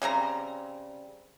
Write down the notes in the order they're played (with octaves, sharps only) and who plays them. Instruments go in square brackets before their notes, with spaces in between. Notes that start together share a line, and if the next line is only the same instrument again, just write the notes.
[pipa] C#3 G3 C4 A#5